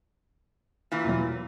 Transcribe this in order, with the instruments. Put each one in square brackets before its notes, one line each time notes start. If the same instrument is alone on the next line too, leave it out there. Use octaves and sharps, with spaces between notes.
[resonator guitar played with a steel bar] A#2 E3
[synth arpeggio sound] E2 B2 F#3